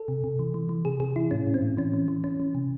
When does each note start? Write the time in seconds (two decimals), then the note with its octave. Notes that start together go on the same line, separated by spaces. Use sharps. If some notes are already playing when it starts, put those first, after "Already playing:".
Already playing: A4
0.08 C3
0.24 C3
0.39 E3
0.54 E3
0.69 E3
0.85 C3 G#4
1.00 C3 G#4
1.16 E3 E4
1.31 A2 C#4
1.47 A2
1.54 C4
1.62 A2
1.77 E3 C#4
1.93 E3
2.08 E3
2.24 E3 C#4
2.40 E3
2.55 C3